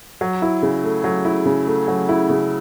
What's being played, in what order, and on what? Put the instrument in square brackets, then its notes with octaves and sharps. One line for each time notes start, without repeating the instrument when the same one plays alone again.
[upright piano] F#3
E4
C#3
A3
F#3
E4
C#3
A3
F#3
E4
C#3